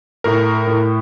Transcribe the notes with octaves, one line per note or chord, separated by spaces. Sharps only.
A2 A#4
A2